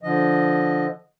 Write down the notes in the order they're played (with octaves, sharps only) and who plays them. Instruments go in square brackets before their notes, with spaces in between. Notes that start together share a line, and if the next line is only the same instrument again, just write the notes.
[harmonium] D3 F3 D#5